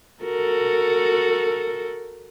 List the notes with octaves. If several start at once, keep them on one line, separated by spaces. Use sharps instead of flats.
F#4 A4 A#4